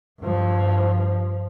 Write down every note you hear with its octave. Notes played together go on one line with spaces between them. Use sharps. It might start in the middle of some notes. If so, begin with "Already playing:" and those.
G2 F3